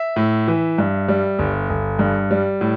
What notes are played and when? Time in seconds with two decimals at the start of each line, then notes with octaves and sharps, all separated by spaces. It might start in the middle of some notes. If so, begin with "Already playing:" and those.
Already playing: E5
0.16 A2
0.48 E3
0.78 G2
1.08 G3
1.39 G1
1.70 G1
1.99 G2
2.31 G3
2.61 A2